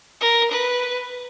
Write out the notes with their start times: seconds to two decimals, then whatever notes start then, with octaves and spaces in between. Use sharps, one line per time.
0.21 A#4
0.51 B4